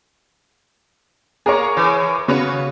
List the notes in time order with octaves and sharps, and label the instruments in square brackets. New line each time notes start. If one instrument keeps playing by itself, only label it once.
[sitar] A#3 [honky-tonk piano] G#4 A#4 C#5
[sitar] E3
[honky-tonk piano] C#3 [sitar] F#4 B4 C#5